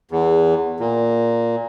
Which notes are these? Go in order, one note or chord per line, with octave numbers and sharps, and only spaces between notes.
E2
A#2